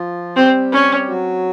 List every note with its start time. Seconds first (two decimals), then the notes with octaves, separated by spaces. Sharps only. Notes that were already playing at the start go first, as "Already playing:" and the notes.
Already playing: F3 F4
0.36 G3 C4 G4
0.72 C#4
1.09 F#3 F#4